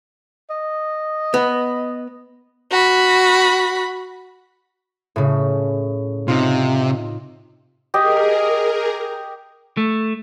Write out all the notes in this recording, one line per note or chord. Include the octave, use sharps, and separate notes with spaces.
D#5
B3
F#4 B5
A2 C#3
C3 D#4 F4
G4 G#4 A#4 D#5
A3